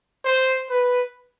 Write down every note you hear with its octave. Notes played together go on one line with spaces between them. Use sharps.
C5
B4